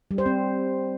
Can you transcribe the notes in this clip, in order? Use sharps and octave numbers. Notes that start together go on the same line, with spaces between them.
G3
C5
C4